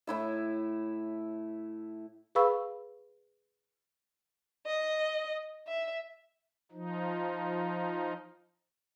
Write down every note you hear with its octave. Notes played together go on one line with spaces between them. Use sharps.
A2 E4 E5
G#4 B4 F5 B5 C#6 E6
D#5
E5
F3 D#4